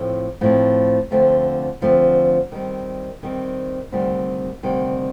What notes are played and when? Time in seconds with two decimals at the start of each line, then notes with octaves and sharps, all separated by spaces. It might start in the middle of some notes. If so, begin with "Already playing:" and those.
Already playing: A2 F3 A3 C4
0.41 A2 F3 A3 C4
1.11 D2 D3 F3 A3 C4
1.82 D2 D3 F3 A3 C4
2.52 D#3 G3 C4
3.23 D#3 G3 C4
3.92 D2 C3 D#3 G3
4.63 D2 C3 D#3 G3